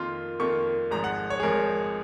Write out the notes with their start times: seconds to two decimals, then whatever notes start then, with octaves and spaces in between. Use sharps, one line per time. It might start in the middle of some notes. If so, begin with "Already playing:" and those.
Already playing: F2 D#3 A#3 F4 C6
0.40 F2 D#3 A#3 F4 C#6
0.91 G#1 G#2 F3 A#5
1.04 F#5
1.30 C#5
1.40 G#4
1.43 G#1 G#2 F3 A#4